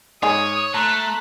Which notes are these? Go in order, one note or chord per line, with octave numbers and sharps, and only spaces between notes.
G#2 D#4 G#4 C#5 D#6
A3 A5 A#5 C6 F#6